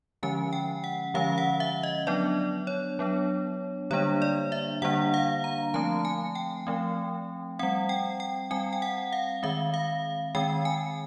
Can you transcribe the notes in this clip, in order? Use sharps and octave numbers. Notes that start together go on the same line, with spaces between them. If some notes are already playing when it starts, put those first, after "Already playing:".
D3 F3 G#3 C#4 G#5
G5
F#5
D3 F3 G#3 C#4 F5
F#5
E5
D#5
F#3 B3 D4 D5
C#5
F#3 B3 D4
D3 G3 A#3 D4 C#5
D5
E5
D3 G3 A#3 D4 F#5
F5
A#5
F3 A3 C4 A5
G#5
G5
F3 A3 C4
G3 C4 F#5
G5
G5
G3 C4 G#5
G5
F#5
F5
D#3 G#3 C4 E5
F5
D#3 G#3 C4 G5
G#5